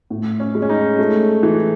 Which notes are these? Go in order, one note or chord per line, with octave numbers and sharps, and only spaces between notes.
A2
C#4
G#3
C#4
D#4
A3
E3